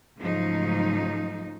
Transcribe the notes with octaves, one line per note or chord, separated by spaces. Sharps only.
G#2 C#3 F3 F#3 A3 D#4